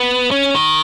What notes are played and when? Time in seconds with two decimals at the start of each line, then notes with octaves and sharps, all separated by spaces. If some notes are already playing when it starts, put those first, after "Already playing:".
Already playing: B3
0.31 C#4
0.55 D#3